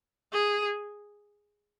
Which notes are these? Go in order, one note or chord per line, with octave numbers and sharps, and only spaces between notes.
G#4